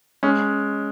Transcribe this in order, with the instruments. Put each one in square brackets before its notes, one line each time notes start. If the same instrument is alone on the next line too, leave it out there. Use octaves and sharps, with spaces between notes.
[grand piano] G#3 C#4